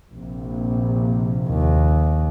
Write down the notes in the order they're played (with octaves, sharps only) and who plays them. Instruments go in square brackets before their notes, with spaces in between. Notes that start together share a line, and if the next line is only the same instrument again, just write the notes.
[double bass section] A#1 C3
[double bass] D#2